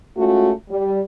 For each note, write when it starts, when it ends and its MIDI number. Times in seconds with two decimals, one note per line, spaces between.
0.17 0.51 56
0.17 0.51 57
0.17 0.51 61
0.17 0.51 65
0.17 0.51 66
0.70 1.01 55